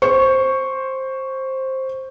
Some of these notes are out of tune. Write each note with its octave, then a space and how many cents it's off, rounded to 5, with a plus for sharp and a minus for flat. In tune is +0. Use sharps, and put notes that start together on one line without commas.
C5 +10 C#6 +0